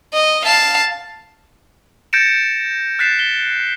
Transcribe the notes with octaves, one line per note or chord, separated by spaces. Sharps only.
D#5
F5 A5
G6 A6 A#6 C#7 D7 E7
F6 F#6 A6 B6 C7 E7
G7